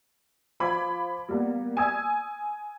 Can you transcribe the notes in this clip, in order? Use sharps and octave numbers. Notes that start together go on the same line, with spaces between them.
F3 B5 D6 G#6
G3 A#3 B3
G#5 D#6 E6 G#6